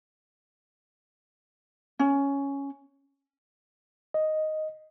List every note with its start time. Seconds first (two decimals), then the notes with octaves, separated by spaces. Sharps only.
1.99 C#4
4.14 D#5